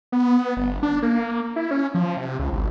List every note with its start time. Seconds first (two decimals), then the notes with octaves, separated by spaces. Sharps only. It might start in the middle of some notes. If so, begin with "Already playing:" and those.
0.12 B3
0.57 G1
0.83 D4
1.03 A#3
1.56 E4
1.71 C#4
1.94 F3
2.17 C3
2.39 C#2
2.52 G#1